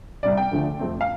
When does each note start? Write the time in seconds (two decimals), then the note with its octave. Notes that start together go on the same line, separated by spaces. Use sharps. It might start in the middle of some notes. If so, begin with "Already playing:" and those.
0.23 C2 C3 G3 D5
0.37 G5
0.52 D2 D3 F3 A3
0.79 F2 F3 A3 C4
1.01 F5